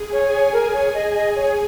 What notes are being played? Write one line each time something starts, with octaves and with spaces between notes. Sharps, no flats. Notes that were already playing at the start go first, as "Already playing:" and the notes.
Already playing: G#4
C#5
G#5
C#5
A#4 G#5
C#5
D#5
D#5
C#5